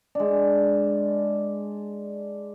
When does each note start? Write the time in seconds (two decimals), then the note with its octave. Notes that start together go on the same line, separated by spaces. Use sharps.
0.15 G#3 D4